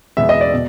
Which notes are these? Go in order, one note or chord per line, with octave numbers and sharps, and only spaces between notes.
E2 B2 G#3 B3 E5
D#5
D5
B2